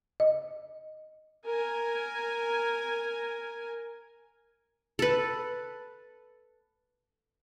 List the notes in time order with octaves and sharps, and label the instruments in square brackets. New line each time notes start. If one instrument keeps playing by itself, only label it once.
[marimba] D#5
[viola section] A#4 G#5
[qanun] A4 B4